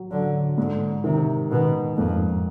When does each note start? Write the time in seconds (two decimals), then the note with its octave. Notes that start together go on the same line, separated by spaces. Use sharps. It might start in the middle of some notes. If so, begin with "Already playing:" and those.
Already playing: F#3
0.11 D3 F#3
0.58 G#2 D3
1.04 C3 D#3
1.51 B2 D#3
1.97 F2 G#2